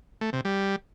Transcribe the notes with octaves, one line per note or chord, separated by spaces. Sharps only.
A3
C3
G3